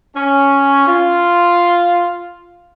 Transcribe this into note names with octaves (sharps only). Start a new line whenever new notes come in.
C#4
F4